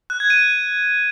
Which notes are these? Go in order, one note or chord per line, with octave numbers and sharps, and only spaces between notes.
F#6
G#6
D#7